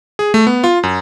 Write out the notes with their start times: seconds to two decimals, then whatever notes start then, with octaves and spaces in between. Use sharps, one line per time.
0.19 G#4
0.34 A3
0.47 B3
0.64 F4
0.83 F#2